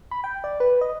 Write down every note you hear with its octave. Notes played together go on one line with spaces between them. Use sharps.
B5
G5
D5
B4
D#5